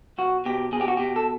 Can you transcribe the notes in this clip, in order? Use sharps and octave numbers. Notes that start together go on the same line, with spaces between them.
B1 F#4
B2 G4
B2 G#4
G4
F#4
B2 G4
A4